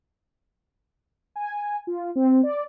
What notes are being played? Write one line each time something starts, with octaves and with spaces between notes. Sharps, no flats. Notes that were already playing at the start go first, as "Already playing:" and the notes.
G#5
F4
C4
D5